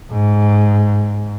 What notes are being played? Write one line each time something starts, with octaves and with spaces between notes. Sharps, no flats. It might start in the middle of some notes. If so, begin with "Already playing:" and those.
G#2